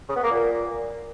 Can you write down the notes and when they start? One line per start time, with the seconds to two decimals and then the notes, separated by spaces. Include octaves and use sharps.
0.08 C#3
0.16 B3
0.23 A#3
0.31 A#2